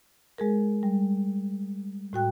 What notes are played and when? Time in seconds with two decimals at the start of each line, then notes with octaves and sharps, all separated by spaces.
0.38 G#3 G#4 A#4
0.83 G3
2.13 A2 F#4 G5 F#6